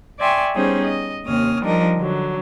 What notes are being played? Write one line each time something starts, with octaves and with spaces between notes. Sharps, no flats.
D5 E5 G5 G#5 C6 C#6
G3 B3 C#4 D#4 G#4 C5
D#5
D#2 C3 A#3 C#4 D#6 F6
F3 G3 D4 D#4 A#4 D#5
D3 F#3